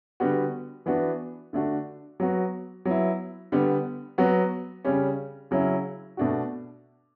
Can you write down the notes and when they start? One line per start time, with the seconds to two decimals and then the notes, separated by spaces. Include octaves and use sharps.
0.20 D3 G3 B3 F#4
0.86 E3 B3 D4 F#4
1.53 D3 A3 D4 F#4
2.20 F#3 B3 F#4
2.85 F#3 B3 E4
3.52 D3 G3 B3
4.18 F#3 B3 F#4
4.85 C#3 G3 C#4
5.51 C#3 F#3 C#4 E4
6.17 B2 A3 D4 F#4